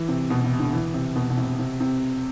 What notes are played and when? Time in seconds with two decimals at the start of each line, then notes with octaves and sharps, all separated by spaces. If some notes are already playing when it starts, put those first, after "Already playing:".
Already playing: E3
0.08 C3
0.30 B2
0.44 C3
0.59 D3
0.73 E3
0.94 C3
1.15 B2
1.30 B2
1.37 C3
1.59 C3
1.80 C3